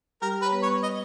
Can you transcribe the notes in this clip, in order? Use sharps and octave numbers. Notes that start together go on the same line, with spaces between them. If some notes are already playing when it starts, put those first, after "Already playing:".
G3 G4 A#4
B4
C#5
B3 B4
C#5
D#5